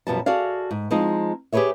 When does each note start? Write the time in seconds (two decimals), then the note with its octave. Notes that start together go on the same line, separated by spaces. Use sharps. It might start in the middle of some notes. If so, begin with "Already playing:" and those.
0.07 F#2 B2 F3 G3 B3 A5
0.26 F#4 G#4 A4 D5 F5
0.71 G#2
0.91 F3 G#3 C4 D#4
1.52 G4 G#4 A#4 B4 C#5 E5